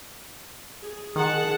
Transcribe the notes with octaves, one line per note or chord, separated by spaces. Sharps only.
G#4
D#3 G#4 F#5 A5